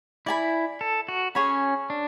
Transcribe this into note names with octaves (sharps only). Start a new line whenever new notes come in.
E4 D5 G#5 B5
A4
F#4
C#4 G#4 C#5 G#5 B5
D4